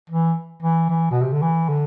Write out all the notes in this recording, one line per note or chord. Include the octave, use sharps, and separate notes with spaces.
E3
E3
E3
B2
C3
D3
E3
D3